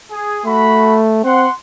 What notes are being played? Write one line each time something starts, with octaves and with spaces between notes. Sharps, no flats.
G#4
A3 F#4 A4 B5
C4 F#5 C6